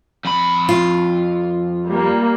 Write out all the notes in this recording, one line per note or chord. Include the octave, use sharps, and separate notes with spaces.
F2 B5
F4
G3 A#3